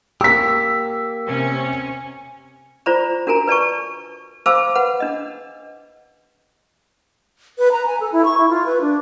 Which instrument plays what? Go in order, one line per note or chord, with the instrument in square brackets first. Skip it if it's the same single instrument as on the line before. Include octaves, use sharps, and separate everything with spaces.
[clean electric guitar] A#3 G4 [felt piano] E6 B6
[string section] C3 C#4 C#7
[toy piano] F4 C5 D5 A#5 B5
D4 F#4 A#4 G#5 A#5
B4 D5 A5 C#6
C5 F5 A5 B5 D6 E6
B4 F#5 B5
D4 D#5
[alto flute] B4
A#5
G#5
A4
E4
C#6
E4
F4
B4
D4